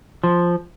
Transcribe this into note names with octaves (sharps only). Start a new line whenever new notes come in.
F3